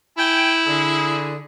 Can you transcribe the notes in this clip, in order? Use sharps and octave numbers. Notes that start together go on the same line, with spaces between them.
E4 G5 G#5
D3 G#4